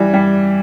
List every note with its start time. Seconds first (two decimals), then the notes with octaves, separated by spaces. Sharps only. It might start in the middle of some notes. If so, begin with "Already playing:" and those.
Already playing: E3 G3
0.14 G3